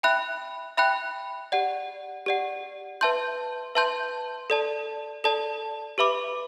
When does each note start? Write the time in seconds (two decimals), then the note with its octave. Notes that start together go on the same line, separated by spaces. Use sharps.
0.03 E5 G5 B5 F#6
0.77 E5 G5 B5 F#6
1.52 G4 D5 F#5
2.26 G4 D5 F#5
3.01 B4 E5 A5 C6 G6
3.75 B4 E5 A5 C6 G6
4.50 A4 D5 A5
5.24 A4 D5 A5
5.98 G4 B4 E5 B5 D6